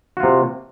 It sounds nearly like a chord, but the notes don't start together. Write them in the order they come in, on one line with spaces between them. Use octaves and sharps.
F#4 F4 C3